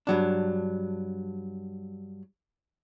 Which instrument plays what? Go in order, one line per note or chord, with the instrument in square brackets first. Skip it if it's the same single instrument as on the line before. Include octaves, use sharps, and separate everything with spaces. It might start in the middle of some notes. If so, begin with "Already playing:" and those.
[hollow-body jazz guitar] G2 F#3 D4